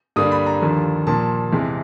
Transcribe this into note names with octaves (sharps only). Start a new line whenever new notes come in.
G2 D3 G3 A#3 D4 D#6
B5
A#5
D#2 D3 F3 A#3
A#2 F3 A#3 A5
E2 C3 E3 G#3